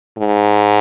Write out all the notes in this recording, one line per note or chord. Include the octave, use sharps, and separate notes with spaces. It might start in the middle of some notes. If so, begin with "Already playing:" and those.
G#2